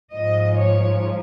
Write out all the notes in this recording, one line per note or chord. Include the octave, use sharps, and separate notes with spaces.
G#2 F3 D#5
C#5